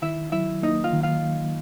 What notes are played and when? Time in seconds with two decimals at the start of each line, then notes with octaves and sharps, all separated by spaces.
0.02 D#3 E4 E5
0.32 F#3 E4 E5
0.63 A#3 D#4 D#5
0.84 F4 F5
0.93 D#3
1.03 F4 F5